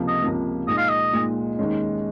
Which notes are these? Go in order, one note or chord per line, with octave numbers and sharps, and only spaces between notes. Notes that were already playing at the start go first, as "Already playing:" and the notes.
Already playing: C#2 C3 F3 A#3
D#5
C#2 C3 F3 A#3
A#2 G#3 D#4 D#5
F5
D#5
A#2 G#3 D#4
D#2 D#3 G#3 C#4